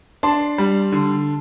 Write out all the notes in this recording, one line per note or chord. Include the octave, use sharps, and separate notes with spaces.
D4 A5 C6
G3
D3